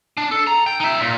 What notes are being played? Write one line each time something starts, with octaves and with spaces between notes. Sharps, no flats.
D4
A4
A#5
G5
D#4 E5
A#2